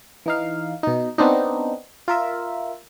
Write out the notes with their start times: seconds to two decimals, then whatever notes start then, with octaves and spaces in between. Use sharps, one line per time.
0.26 E3 D#4 F5
0.83 B2 D#4
1.18 B3 C4 D4 D#4
2.08 F4 A#4 E5